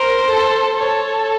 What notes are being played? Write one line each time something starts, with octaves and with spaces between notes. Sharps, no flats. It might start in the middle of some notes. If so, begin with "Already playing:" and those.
Already playing: A#4 C5
A4
A4 C#5